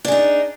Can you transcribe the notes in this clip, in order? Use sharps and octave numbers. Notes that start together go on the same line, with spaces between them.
D4 D#4 G#4